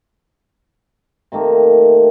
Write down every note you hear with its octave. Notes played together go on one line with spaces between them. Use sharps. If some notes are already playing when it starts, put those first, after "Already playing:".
C3 D#3 A3 A#3